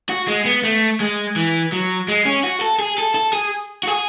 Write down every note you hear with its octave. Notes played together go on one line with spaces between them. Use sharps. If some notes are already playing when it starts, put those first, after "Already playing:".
F#4
G#3
B3
A3
G#3
E3
F#3
G#3
C#4
F#4
A4
G#4
A4
A4
G#4
F#4
G#4